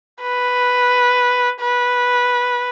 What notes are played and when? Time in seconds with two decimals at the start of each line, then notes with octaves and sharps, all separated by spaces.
0.22 B4
1.61 B4